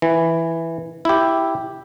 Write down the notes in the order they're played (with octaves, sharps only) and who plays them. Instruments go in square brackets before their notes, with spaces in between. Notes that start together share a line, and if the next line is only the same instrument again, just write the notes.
[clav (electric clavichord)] E3
E4 G4